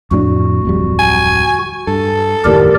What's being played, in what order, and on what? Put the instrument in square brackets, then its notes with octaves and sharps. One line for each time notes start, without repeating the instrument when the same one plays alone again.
[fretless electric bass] F2 A2 D4 [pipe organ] F#4
[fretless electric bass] D1 F2 G3
[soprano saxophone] G#5
[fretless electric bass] G2 [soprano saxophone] A4
[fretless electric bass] F#1 D#2 A2 [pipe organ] G4 A#4 D5